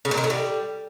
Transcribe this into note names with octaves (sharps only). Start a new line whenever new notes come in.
C#3
A#2
D#3
A2
G3